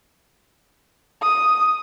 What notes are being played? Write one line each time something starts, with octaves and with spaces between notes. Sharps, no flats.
D#6